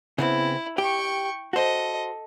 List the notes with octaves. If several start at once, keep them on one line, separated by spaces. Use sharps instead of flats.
C#3 B3 C4 E4
G4 G5 C#6
F#4 A4 C5 D#5